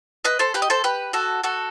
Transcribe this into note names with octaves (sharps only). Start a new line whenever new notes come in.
B4 D#5
A4 C5
G4 B4
D#5
A4 C5
G4 B4
F#4 A4
F#4 A4